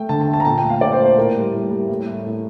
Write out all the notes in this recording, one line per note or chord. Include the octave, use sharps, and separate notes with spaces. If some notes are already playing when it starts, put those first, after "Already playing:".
Already playing: A3 G5
D3 A5
A5
A3
A5
A#5
A#2 A5
G5
A3
F5
A#2 D5
C5
A3
C5
A2 A#4
G3 A#3
A2
G3 A#3
A2
A3
A2